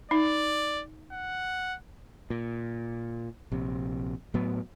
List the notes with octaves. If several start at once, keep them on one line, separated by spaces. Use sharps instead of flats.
D#4 D5
F#5
A#2
A#1 C3
A2 F#3 B3